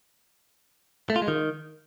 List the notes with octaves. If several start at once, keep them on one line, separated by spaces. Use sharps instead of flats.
A3
F4
G#3
D#3